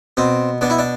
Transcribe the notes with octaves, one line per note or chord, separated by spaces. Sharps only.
B2 C4
B2 D4
E4
D4